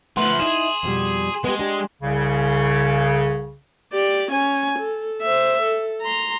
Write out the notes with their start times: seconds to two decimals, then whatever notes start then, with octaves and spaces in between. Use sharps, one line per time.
0.17 F3 A3 B3 B4 F#5 C6 F#7
0.40 D#4 E4 G#4 E7
0.83 F2 B2 G3
1.44 G#3 B3 G4
1.59 D4 G4
2.02 C2 C#3
3.93 G4 D5
4.32 C#4 G#5
4.79 A4
5.22 C5 E5
5.63 A4
6.02 A#5 C6